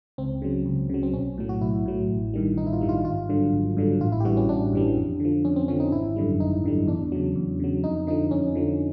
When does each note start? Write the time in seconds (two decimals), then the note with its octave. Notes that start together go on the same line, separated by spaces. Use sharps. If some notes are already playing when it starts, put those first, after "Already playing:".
0.18 C#2 C4
0.42 C#3 F#3
0.66 C#2
0.89 C#3 F#3
1.03 C4
1.13 B1 C#4
1.38 A2 F#3
1.49 F#4
1.62 B1 E4
1.86 A2 F#3
2.10 A1
2.34 G2 D#3 G3
2.57 A1 D#4
2.67 E4
2.73 F4
2.81 G2 D#3 G3
2.89 F4
3.05 G#1 F4
3.29 G2 D3 F#3
3.53 G#1
3.77 G2 D3 F#3
4.01 A1 F4
4.12 E4
4.20 G4
4.25 G2 E3 G3 F#4
4.37 C#4
4.48 A1 D4
4.73 G2 E3 G3
4.97 F2
5.20 D3 F3
5.45 F2 C#4
5.56 C4
5.68 D3 F3 C#4
5.80 D#4
5.92 G#1 E4
6.16 F#2 D3 G3
6.40 G#1 D#4
6.64 F#2 D3 G3
6.87 E2 D4
7.12 C#3 F#3
7.36 E2
7.60 C#3 F#3
7.84 F2 D#4
8.07 D3 F3 D#4
8.31 F2 C#4
8.55 D3 F3